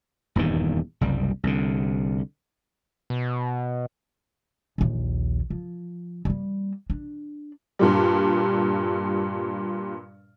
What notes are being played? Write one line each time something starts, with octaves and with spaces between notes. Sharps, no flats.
D#1 E2 G2 D#3
F#1 C2 G3
C2 D3
B2
A#1 D#2
F3
G3 A#3
D4
G2 A#2 G3